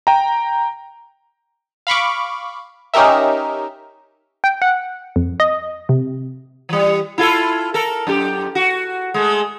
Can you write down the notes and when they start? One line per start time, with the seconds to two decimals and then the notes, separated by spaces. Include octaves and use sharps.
0.07 G5 A#5
1.87 F5 B5 C#6 D6
2.94 C#4 D#4 G4 A#4 E5
4.44 G5
4.62 F#5
5.16 F2
5.40 D#5
5.89 C3
6.69 E3 G3
7.18 E4 F4 A4
7.74 A4 A#4
8.07 F#2 G4
8.55 F#4
9.14 G#3 A3